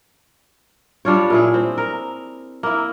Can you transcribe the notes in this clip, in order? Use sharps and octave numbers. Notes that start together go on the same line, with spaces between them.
G3 D4 F4 C#5
A#2 E4 G#4
C4
A#4
A#3 E4